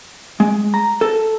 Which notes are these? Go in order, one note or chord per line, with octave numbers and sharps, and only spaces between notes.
G#3
A#5
A4